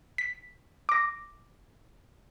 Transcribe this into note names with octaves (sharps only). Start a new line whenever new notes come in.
B6
D6 A#6